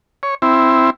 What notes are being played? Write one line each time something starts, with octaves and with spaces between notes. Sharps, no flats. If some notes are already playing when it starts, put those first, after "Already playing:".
C#5
C4 E4